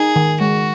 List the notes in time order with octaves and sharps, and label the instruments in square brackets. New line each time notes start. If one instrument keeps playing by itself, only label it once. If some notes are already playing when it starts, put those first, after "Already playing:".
Already playing: [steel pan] D#4 [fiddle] G#4
[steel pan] D#3
[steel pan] G#3 [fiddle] F#4